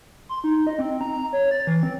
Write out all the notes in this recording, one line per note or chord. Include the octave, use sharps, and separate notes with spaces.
C6
D#4
D#5
C4
A#5
A#5
C#5
A6
E3
C4